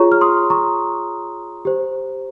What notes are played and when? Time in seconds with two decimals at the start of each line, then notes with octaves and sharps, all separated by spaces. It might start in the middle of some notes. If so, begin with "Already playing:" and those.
Already playing: F4 G#4 C#5 A#5 C#6
0.12 F6
0.21 C6 D#6
0.50 A#5 C#6
1.65 G4 C5